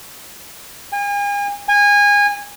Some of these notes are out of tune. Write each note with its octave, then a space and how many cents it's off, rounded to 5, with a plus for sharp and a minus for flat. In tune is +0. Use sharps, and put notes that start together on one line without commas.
G#5 -40
G#5 -25